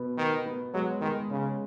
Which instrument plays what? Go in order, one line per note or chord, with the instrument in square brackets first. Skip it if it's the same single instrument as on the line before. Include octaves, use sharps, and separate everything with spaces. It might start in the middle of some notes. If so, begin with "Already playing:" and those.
Already playing: [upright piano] B2 B3
[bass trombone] D#3 [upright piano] B3
[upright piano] B3
[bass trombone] F#3 [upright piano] G#3
[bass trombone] D#3 [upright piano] G#3
[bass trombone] C#3 [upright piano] C#4